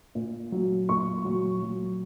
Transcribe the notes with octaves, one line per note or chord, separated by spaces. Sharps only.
A#2
F#3
A#2 C#6
F#3
F#3